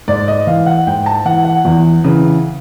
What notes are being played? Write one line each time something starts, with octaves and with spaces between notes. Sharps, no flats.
G#2 D5
D#5
E3 F5
F#5
G#2 G5
A5
E3 F#5
F#5
E2
C#3 E3